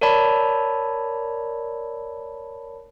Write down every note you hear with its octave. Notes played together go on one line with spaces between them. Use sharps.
A#4 C#5 D5 A5 B5